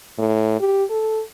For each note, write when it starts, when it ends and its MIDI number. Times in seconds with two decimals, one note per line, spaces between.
0.18 0.57 45
0.60 0.84 67
0.90 1.22 69